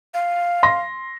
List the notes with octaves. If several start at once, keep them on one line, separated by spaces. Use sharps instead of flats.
F5
C6 A#6